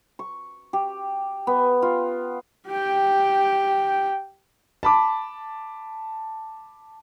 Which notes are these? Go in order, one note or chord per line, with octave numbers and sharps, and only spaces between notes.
C#6
G4
B3
F4
G4 G5
A5 B5 D6